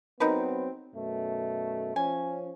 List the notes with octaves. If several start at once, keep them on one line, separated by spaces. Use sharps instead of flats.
F#3 B3 C4 D#4 A#4 B4
F#2 B2 A3
F3 C#4 G#5